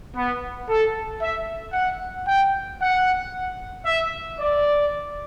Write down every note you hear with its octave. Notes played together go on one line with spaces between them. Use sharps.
B3
A4
E5
F#5
G5
F#5
E5
D5